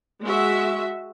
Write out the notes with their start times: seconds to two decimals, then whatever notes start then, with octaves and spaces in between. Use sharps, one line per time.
0.24 G#3 F#4 E5